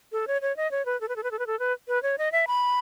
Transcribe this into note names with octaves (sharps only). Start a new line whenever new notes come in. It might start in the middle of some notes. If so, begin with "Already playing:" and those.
A4
C#5
C#5
D#5
C#5
B4
A4
B4
A4
B4
A4
B4
A4
B4
B4
C#5
D#5
E5
B5